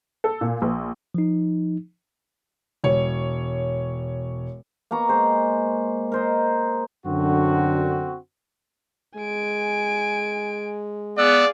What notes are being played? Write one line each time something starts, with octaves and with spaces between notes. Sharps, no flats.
A4
A#2
A#1
F3 D#4
E1 C#5
A#3 B3 A#5 C#6
G#3 C5
A#4 C5 D#5
F#2 D3 C4 F#4
G#3 G#5 D7
B3 G#4 D5 F5 E6 F#6